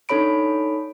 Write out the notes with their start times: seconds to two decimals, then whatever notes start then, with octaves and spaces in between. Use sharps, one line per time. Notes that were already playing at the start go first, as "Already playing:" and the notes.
0.09 D4 D#4 A4 C#5 B5 D7